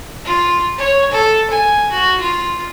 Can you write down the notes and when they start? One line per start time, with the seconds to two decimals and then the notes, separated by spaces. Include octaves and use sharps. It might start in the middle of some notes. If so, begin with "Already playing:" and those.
0.25 F4
0.78 C#5
1.12 A4
1.51 G#5
1.91 F#4
2.20 F4